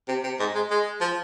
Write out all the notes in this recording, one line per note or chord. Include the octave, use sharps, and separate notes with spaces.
C3
C3
G#2
G#3
G#3
F3